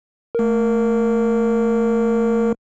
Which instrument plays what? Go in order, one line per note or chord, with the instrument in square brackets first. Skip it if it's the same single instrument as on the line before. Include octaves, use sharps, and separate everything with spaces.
[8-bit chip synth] A3 A#4